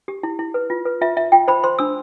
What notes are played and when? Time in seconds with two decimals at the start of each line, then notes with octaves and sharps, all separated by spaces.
0.08 G4
0.23 E4
0.39 E4
0.54 B4
0.70 F4
0.85 B4
1.01 F4 E5
1.17 F4 E5
1.32 F4 G5
1.48 C5 B5
1.64 C5 C6
1.79 D4 E6